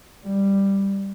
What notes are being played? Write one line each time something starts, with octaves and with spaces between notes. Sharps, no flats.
G3